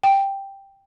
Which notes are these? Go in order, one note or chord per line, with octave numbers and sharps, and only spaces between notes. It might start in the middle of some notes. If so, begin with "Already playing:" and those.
G5